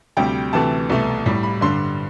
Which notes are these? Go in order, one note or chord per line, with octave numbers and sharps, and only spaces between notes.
D2 C3 G3 G5
D2 C3 E3 A3 A5
C2 B2 A3
A2 G3
B5
G2 D3 G3 C6